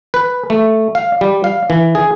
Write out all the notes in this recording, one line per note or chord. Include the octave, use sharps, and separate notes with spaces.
B4
A3
F5
G3
F5
E3
G#4